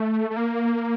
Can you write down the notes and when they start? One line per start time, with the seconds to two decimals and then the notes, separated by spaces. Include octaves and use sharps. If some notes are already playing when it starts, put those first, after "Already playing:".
Already playing: A3
0.30 A3
0.36 A#3